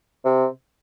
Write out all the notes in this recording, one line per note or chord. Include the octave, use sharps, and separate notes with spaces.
C3